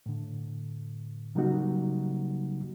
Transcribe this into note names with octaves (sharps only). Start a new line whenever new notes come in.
A2 D3
C#3 F#3 G3 A#3 D#4 F#4